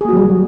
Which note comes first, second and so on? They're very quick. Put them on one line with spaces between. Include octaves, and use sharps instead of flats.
G#4 A#3 F#4 F#3 G3